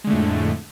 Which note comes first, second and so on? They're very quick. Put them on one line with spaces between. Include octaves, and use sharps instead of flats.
G#3 D3 A3 F2 A2